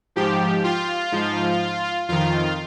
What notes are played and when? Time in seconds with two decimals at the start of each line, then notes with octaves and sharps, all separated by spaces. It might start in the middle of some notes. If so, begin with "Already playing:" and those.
0.16 G#2 F3 G4
0.64 F4
1.12 G#2 F3
2.09 F2 D#3 F4